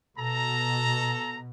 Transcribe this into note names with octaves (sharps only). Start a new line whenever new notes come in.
B2 A4 A#5